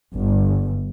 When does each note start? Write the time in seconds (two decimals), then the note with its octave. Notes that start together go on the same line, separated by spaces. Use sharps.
0.14 G1